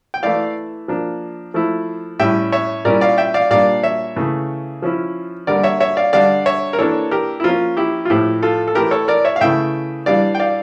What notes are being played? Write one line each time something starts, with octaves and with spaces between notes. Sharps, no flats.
G5
E3 A3 E4 D5 F5
F3 A#3 D4
F3 A3 E4
A2 G3 C#4 E4 E5 G5
C#5 E5
A#2 G3 C#4 E4 A#4 D5
D5 F5
E5 G5
D5 F5
A#2 G3 A#3 D4 D5 F5
C#5 E5
C#3 E3 A3
F3 C#4 E4
D3 G3 A#3 A#4 D5
C#5 E5
C#5 E5
D5 F5
D3 G3 D4 D5 F5
C#5 E5
A#4
E3 A#3 D4 A4 C#5
G4 A#4
E4
F3 A#3 C#4 F4
E4 G4
F4
A2 F3 A3 E4 G4
F4 A4
A4
E3 A3 E4 G4 A#4
A4 C#5
A#4 D5
C#5 E5
F5
C#3 E3 A3 E4 E5 G5
E3 G3 D4 D5 F5
G5
D5 F5